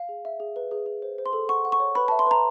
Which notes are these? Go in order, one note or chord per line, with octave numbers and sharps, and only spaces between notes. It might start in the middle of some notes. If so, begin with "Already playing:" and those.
Already playing: F5
G#4
E5
G#4
B4
G#4
G#4
C5
C5
C6
A4
F#5 C#6
F#5
C#6
C#5
B4 B5
E5 A5
C6
B4 A#5